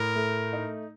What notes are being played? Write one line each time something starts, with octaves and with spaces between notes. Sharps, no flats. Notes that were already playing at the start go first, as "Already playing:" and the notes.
Already playing: A2 A#4
A3
D#4